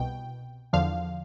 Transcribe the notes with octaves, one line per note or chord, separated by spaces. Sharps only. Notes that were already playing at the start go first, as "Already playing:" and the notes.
Already playing: C2 B2 G5
E2 D3 F3 F5